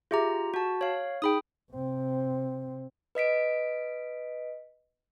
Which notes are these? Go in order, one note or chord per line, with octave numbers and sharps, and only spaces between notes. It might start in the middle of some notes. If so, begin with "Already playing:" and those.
F4 G4 G#4 E5 A#5 D6
F#4 A5
C#5 F5
D#4 G#4 G5 B5 D#6
C3 C4
B4 D#5 B6 D7